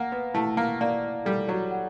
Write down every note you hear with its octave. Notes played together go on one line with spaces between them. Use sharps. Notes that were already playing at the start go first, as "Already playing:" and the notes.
Already playing: A#3 F#5
B3
A3 E4
A#3
A#3 D5
G3 A4
F#3
F#5